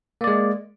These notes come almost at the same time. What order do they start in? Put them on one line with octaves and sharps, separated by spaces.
A#3 D5 G#3